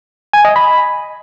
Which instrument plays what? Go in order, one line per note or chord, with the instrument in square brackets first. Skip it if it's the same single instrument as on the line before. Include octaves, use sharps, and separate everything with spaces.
[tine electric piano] G#5
D#5
B5